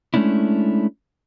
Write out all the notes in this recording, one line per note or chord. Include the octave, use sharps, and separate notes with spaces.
G#3 A3 C#4 D4 E4